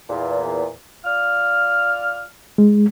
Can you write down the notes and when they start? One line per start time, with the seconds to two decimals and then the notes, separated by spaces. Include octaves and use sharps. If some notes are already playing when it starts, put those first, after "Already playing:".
0.09 E2 A#2
1.04 F4 D5 F6
2.58 G#3